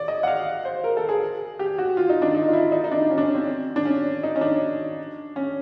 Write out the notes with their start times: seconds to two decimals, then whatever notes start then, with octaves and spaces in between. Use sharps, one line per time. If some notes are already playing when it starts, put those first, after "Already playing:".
Already playing: C#5 D5
0.08 D#5
0.23 F#5
0.27 F5
0.65 C5
0.84 A#4
0.97 A4
1.09 G#4
1.59 G4
1.78 F#4
1.97 F4
2.10 D#4
2.22 D4
2.35 D#4
2.48 F4
2.53 E4
2.72 D#4
2.84 D#4
2.91 D4
3.10 C#4
3.18 D4
3.23 C#4
3.35 C4
3.76 D4
3.85 C#4
4.23 D#4
4.36 C#4
4.41 D4
5.36 C#4